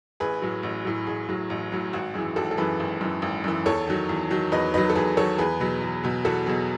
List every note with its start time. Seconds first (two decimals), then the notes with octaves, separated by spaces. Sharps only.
0.20 A1 G#4 B4
0.42 A2 F#3
0.63 A1
0.85 A2 F#3
1.07 A1 G#4
1.28 A2 F#3
1.50 A1
1.72 A2 F#3
1.93 G#1 F#4
2.14 F#2 E3 G#4
2.36 G#1 F#4 A4
2.51 A4
2.57 F#2 E3 G#4 B4
2.80 G#1
3.01 F#2 E3
3.22 G#1
3.44 F#2 E3
3.66 E2 A4 C#5
3.87 D#3 F#3
4.09 E2
4.30 D#3 F#3
4.52 E2 B4 D#5
4.74 D#3 F#3 B4 D#5
4.90 A4
4.95 E2 G#4 B4
5.17 D#3 F#3 A4 C#5
5.38 E2 G#4 B4
5.60 B2 F#3
5.82 E2
6.04 B2 F#3
6.25 E2 F#4 A4
6.46 B2 F#3 G#4